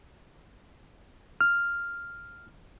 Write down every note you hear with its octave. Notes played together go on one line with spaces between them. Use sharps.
F6